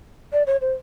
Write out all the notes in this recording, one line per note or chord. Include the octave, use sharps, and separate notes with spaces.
D5
C#5
C5